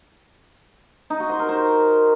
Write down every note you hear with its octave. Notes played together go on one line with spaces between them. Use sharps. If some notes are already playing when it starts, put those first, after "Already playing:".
D#4
F#4
C5
A#4
C5